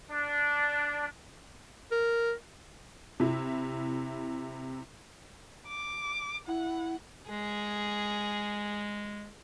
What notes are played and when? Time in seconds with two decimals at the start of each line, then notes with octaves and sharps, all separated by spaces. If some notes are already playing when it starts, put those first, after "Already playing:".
0.10 D4
1.91 A#4
3.20 C3 E4
5.68 D6
6.47 E4 F#5
7.29 G#3 G#4